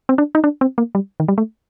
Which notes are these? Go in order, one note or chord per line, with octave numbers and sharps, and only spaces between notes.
C4
D4
D#4
D4
C4
A#3
G3
D#3
G3
A3